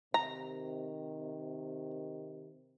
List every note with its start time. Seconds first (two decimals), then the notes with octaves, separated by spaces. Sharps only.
0.14 C3 D#3 A#5